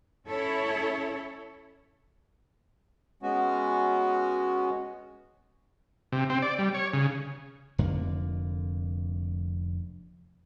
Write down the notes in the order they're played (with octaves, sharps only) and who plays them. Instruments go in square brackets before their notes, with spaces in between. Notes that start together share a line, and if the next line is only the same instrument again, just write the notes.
[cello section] C#4 E4 A4 C#5
[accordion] G#3 B3 C#4 F#4
[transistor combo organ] C3
C4
D5
G3
C#5
C#3
[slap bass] F1 F2 D3 A#3